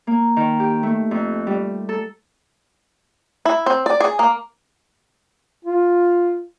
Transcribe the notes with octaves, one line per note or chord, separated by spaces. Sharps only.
A#3
D#3
G4
A3
F2
G3
A4
E4
C4
D5
G#4
A#3
F4